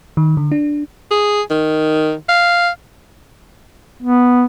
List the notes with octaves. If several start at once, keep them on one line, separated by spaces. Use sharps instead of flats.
D#3
D3
D4
G#4
D#3
F5
B3